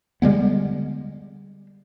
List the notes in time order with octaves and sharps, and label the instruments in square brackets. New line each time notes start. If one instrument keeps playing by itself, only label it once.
[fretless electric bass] D3 G3 G#3 B3